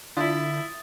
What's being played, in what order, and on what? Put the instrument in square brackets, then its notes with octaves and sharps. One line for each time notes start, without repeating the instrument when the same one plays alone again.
[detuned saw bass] D3 [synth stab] D4 F4 [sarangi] E4 [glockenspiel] D#6 A6